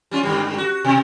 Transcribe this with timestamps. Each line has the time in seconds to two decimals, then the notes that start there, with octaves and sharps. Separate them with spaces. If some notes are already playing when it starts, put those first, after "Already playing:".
0.11 G3 C#4 F4
0.23 G2 D3 G3
0.58 F#4
0.84 B2